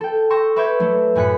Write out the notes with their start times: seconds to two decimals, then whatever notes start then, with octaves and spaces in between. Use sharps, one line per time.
0.01 A4 G5
0.30 G5 C6 C#6 E6 A#6
0.56 B4 E5 C#6 D6 G6 G#6
0.80 F#3 A3 D4
1.15 F#2 A2 G#5 F#6 B6 C#7